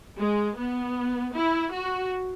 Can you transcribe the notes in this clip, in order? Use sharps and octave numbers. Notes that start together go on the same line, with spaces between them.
G#3
B3
E4
F#4